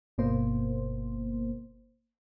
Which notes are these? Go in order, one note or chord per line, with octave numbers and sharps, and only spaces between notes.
G1 B2 A#3 C5